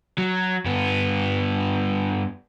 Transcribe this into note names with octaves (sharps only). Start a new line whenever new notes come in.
F#3
G2 B3